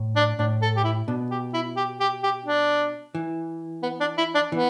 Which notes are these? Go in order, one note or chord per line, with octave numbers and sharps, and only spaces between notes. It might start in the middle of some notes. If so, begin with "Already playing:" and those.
Already playing: A2
D4
A2 D4
A4
G4
E4
B2 D4
G4
E4
G4
G4
G4
D4
E3
B3
D4
E4
D4
E3 B3